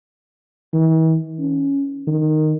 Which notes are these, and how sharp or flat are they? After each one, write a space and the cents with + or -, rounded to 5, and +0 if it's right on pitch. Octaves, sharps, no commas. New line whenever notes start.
E3 -45
C#4 +5
D#3 -10